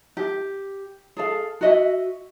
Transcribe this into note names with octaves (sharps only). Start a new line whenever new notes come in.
G4
G#4 A4 F5
F#4 D#5 E5